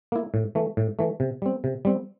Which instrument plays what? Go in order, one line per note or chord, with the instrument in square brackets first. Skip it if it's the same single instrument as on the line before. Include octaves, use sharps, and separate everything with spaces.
[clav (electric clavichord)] A#3 E4
A2
E3 A3
A2
E3 A3
C3
G3 C4
C3
G3 C4